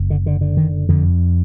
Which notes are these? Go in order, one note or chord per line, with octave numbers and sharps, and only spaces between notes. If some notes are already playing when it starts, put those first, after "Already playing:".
Already playing: F#1
D3
D3
D3
D#3
F2 D3